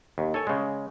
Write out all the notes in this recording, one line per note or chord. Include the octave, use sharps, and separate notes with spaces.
D#2
A4 C#5 G#5
C#3 G#3